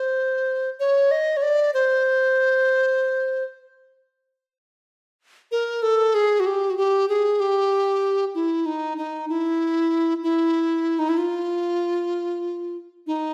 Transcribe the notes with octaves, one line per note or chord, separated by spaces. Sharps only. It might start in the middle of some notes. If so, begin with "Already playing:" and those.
Already playing: C5
C#5
D#5
C#5
D5
C5
A#4
A4
G#4
F#4
G4
F#4
G4
G#4
G4
E4
D#4
D#4
E4
E4
D#4
E4
F4
D#4